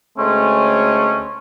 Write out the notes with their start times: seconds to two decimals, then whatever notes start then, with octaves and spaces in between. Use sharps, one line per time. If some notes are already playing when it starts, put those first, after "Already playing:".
0.18 D2 G#3 A3 C4 C#4